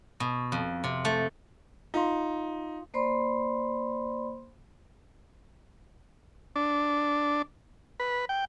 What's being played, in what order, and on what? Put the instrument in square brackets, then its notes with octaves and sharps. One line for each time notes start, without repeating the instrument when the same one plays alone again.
[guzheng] B2
F2
C3
A3
[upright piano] D#4 [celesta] F4 F5 C6
[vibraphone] A#3 C5 D5 B5 C6
[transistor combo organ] D4
B4
G5